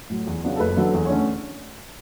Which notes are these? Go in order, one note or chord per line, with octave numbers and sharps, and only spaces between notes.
A2 F#3
E2
C#3 F#3 B3 D4
A4
F#1 B4
F#2 D3 F#3 A4
E2
C#5
D3 A3 C#4